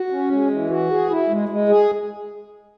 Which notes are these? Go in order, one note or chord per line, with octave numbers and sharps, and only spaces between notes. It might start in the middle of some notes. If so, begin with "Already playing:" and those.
Already playing: F#4
C#4
G#3
E3
F#4
G#4
E4
G#3
G#3
G#4